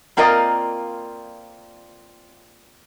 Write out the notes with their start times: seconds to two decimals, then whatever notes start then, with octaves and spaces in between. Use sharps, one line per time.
0.17 A#3 C4 F4 A#4 D5 D#5